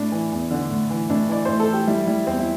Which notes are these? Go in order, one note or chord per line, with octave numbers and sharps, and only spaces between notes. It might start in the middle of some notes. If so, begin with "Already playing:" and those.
Already playing: A2 D4
E3
E2
D3
A2
E3
A2 D4
E3 D5
A2 C5
A4
E3
G4
G3 E4
G3 E4
E2 C4
E4